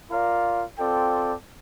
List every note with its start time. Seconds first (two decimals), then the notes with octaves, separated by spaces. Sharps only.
0.09 F4 A#4 D5 F5
0.79 C4 F4 A4 D5 G5